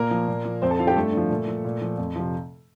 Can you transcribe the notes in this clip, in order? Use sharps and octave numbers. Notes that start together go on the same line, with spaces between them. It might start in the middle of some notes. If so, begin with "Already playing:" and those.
Already playing: A#2 A#3 A#4
F3
A#2
F3
F2 C4 C5
A4 A5
D#3 F4 F5
G4 G5
G2 A3 A4
D3 F3
A#2
F3
A#2
F3
F2
C3 F3